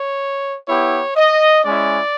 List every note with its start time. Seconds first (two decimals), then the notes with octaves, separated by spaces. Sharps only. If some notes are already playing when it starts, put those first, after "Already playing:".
Already playing: C#5
0.67 B3 E4 G4 C#5
1.16 D#5
1.65 G#3 C#4 E4 D5